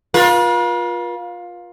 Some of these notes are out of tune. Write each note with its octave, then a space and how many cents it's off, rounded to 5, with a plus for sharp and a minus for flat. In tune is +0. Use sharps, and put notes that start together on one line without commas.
F4 +15 B4 -45